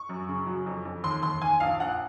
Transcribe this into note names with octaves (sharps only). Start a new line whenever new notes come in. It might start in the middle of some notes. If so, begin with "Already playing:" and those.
Already playing: C#6
F#2
C#3
F#3
F2
F2
D#2 C6
D#2 C6
D#2 G#5
A#1 F5
A#1 F#5